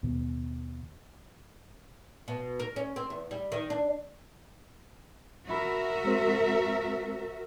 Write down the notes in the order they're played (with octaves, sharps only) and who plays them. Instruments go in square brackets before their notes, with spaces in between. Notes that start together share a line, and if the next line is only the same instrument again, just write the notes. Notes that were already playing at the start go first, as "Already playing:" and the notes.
[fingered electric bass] D#2 B2
[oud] B2
A#4
C#4
C4
E2
G3
D#3
D4
[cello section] F#4 A#4 E5 [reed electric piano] B5
[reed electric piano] G#3 C4 C5